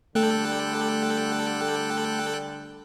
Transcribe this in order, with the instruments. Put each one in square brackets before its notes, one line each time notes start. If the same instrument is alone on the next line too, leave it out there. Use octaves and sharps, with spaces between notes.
[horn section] D3 G3 [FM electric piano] A3 [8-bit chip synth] A4 G5 F#6